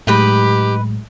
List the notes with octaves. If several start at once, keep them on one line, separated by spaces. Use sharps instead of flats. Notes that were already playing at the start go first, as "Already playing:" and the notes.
A2 F#3 G#3 D#4 G4 B4 B5